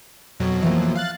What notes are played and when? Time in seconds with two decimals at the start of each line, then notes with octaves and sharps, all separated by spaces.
0.40 F2 B2 F#3
0.62 E3 F3 A#3
0.96 F5 F#6 A6